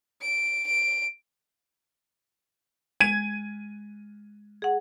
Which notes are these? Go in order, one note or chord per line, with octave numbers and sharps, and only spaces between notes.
D7
D7
G#3 G#6 D#7
G#4 F#5